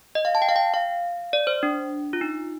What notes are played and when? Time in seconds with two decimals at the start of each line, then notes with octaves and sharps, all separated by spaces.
0.15 D#5
0.25 F5
0.35 A5
0.42 G5
0.49 F5
0.56 G5
0.74 F5
1.33 D5
1.47 C5
1.63 D4
2.13 F4
2.21 D#4